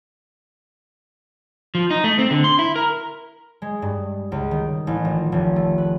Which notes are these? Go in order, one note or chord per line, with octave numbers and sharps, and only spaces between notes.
F3
D#4
A3
C4
D3
C6
E4
A#4
G#3
G2
C#2
D#3
A1
A#1
F1
A3
B4